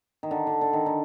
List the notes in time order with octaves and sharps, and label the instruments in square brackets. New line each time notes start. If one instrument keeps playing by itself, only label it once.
[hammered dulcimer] D#3
D3
D3
D3
D#3
D3